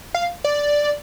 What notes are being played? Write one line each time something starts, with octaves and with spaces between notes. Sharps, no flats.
F5
D5